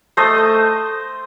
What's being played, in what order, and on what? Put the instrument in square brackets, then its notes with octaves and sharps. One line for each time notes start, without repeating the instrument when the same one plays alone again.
[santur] A3 C5 D#5
A3